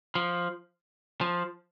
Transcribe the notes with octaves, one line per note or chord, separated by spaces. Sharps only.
F3
F3